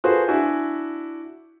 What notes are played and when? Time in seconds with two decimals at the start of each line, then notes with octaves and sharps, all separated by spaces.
0.04 F4 F#4 G#4 A4 B4 C5
0.28 D4 E4 F#4 E5 G#5